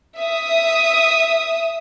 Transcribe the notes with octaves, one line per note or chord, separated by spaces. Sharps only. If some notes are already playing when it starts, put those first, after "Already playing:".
E5 D#6